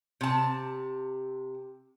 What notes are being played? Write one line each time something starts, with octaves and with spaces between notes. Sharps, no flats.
C3 A5